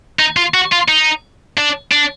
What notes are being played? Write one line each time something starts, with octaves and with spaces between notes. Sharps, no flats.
D#4
F4
F#4
F4
D#4
D4
D4